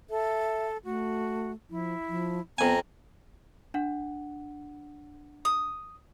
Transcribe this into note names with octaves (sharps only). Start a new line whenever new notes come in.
A4 E5
A3 F#4
F3 E4
F3
F2 B3 G#5 A#5
D4 F#5
D#6